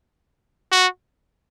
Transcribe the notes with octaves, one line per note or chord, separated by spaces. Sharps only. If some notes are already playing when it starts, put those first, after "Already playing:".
F#4